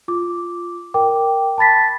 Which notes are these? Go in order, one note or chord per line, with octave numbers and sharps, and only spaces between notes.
F4 D6
A#4 G5 D6
A5 B5 A6 B6